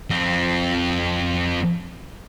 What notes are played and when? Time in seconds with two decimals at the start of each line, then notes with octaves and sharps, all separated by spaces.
0.10 F2 C4